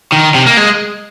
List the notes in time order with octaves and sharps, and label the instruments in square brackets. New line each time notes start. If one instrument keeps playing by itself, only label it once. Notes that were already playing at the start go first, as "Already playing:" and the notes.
[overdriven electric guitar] D#3
C3
A#3
G#3